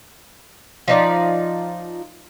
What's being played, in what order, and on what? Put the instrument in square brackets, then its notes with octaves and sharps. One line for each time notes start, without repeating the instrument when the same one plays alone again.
[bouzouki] F3 D#4 D5